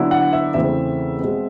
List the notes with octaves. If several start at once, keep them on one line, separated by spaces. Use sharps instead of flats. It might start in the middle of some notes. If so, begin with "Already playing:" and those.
Already playing: D3 F#3 B3 E4
F#5
E5
E2 C#3 E3 A3 C4 E5
B2 G#3 C4